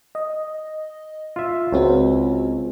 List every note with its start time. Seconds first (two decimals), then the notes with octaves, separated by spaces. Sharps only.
0.15 D#5
1.36 F4 E5
1.72 C#2 C4 F#4 C#5